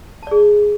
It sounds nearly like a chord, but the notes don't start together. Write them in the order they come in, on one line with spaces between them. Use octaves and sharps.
A5 D5 G#4